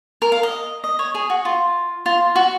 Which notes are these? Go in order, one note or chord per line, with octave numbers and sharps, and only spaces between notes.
A#4
F5
D#5
D#5
C#5
G#4
F#4
F4
F4
F#4